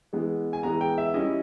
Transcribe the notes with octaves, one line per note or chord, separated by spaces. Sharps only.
E3 G#3 B3
G#5
E3 G#3 B3 A#5
G5
E5
G3 C#4 E4 D#5